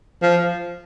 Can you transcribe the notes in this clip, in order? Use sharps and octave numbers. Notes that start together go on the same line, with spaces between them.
F3